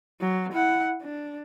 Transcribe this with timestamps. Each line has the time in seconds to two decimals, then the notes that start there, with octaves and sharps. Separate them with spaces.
0.21 F#3
0.53 E4 F#5
1.02 D4